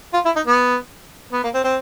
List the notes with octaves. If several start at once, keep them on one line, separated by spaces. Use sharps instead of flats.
F4
E4
D#4
B3
B3
A#3
C4
C4